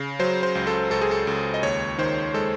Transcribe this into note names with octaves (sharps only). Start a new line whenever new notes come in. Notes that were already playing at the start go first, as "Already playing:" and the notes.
Already playing: C#3
F#3 C5
C5
C#2
A4
C#2 A4
G#4
A4
C#2
D#5
D#2 C#5
D#3 C5
G#3 A4